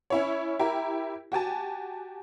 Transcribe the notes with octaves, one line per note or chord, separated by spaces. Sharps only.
C#4 E4 C#5
E4 G4 A#4
F#4 G4 G#5 A5